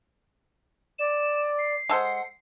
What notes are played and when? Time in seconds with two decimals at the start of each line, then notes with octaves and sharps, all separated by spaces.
0.99 D5 E7
1.59 C7
1.89 G#3 A4 C5 F#5